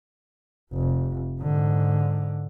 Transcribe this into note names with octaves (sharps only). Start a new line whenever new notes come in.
F1
G#2 D3